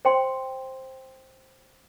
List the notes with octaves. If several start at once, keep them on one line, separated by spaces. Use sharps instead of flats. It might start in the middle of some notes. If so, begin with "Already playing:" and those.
C5 G5 C6